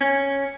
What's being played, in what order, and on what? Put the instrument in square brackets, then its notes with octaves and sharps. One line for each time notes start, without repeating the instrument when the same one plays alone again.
[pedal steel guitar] C#4